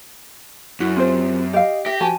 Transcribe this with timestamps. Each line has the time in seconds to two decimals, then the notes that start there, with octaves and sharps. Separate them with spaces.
0.80 F#2 E4 F#4
0.96 C4 F4 G4 C5
1.53 G4 D#5 F5
1.86 G4 E5 A#6
2.01 F3 F#4 G#5 A5